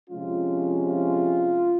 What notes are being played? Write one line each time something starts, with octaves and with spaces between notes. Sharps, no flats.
C3 F3 G#3 C#4 F4
F4